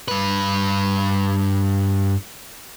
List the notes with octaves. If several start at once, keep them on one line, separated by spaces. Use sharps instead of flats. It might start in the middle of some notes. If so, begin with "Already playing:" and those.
G2 B4